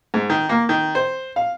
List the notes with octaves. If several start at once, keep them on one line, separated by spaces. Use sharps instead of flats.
G#2
D#3
A#3
D#3
C5
F5